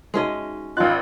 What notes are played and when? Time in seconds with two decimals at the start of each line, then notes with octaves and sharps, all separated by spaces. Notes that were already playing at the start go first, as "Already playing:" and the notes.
0.14 G#3 C#4 D#4 F#4 D#5 E5
0.77 G#1 C#4 F4 D#5 C6 F#6